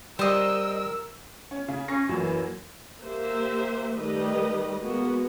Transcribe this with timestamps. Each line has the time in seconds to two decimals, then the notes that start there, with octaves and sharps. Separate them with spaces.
0.19 G3 A#4 C5 D#5 E6
1.51 C#4
1.68 C#3
1.88 C#4 C#6 A#6 C7
2.09 F#2 A#2 E3 F#3
3.01 A#3 G4 C5 E5
3.94 D#3 G3 A3 G4 B4 D#5
4.78 G#3 A#3 B3 F#4